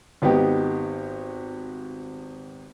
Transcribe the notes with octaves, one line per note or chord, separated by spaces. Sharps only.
G#1 B3 D#4 G4